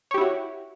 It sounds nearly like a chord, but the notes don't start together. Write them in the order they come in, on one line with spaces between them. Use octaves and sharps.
C#5 G4 E4 F#4